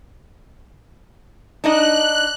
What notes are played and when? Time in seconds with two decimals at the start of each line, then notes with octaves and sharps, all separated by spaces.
1.64 D4 D#4 D#5 F#6